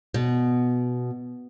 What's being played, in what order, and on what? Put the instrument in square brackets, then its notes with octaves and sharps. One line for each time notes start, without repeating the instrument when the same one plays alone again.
[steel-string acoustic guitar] B2